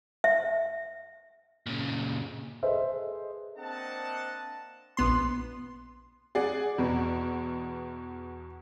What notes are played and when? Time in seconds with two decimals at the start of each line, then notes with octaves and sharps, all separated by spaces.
0.24 E5
1.66 A#2 C#3
2.63 G#4 A4 B4 C5 D#5 E5
3.58 A#3 C4 D4 D#5 F#5 A5
4.97 A#1 B3 C6
6.35 G#4 D5 F#5
6.78 E2 B2